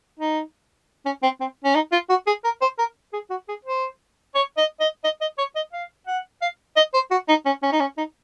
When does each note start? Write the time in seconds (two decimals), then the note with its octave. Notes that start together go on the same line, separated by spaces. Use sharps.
0.19 D#4
1.06 C#4
1.23 C4
1.41 C4
1.64 C#4
1.75 D#4
1.92 F4
2.09 F#4
2.27 G#4
2.44 A#4
2.61 C5
2.79 A#4
3.13 G#4
3.30 F#4
3.48 G#4
3.65 C5
4.35 C#5
4.57 D#5
4.80 D#5
5.04 D#5
5.21 D#5
5.38 C#5
5.55 D#5
5.73 F5
6.07 F#5
6.42 F5
6.76 D#5
6.94 C5
7.11 F#4
7.29 D#4
7.46 C#4
7.63 C#4
7.72 D#4
7.80 C#4
7.97 D#4